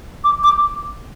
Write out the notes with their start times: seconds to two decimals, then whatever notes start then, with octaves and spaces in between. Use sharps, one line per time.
0.24 D6
0.43 D6